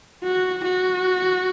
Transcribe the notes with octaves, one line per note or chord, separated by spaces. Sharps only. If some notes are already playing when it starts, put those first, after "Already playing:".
F#4
F#4